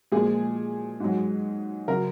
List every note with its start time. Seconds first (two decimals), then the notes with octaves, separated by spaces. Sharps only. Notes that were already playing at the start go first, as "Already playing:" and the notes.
0.12 A#2 F3 G#3 G#4
1.00 G#2 F#3
1.88 C#3 F#3 A#4